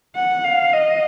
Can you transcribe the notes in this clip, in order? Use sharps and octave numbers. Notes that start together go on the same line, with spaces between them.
F#5
F5
D#5